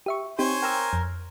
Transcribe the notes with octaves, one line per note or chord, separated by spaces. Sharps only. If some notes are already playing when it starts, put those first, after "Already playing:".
G4 E5 C#6
C4 D#4 G4 C5 C#5 G#5
A#4 G5 A#5 E6
F2